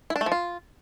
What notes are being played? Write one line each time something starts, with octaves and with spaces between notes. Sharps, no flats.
E4
D4
A3
F3
F4